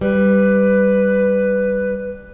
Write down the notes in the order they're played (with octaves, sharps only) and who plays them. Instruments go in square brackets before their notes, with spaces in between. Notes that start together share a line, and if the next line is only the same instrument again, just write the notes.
[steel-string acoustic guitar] G3 [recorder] B4